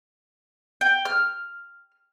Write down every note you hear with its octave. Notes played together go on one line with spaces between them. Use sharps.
G5
F6